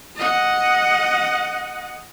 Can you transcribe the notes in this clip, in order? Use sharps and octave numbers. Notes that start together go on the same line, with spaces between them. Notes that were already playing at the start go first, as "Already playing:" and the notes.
D#5 F#5